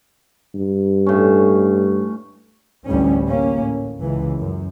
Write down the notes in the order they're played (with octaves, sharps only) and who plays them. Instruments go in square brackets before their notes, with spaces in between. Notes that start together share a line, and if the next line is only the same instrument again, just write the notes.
[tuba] G2
[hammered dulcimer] A2 C#4
[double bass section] A1 D2 G3 C#4
A#3 C#4
A2
C#2 E3
F#2